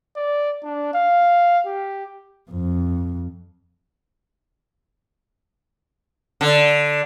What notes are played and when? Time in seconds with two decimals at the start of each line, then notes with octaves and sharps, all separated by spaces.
0.16 D5
0.64 D4
0.94 F5
1.66 G4
2.51 F2
6.41 D3